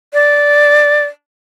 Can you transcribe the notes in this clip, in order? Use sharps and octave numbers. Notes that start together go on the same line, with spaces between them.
D5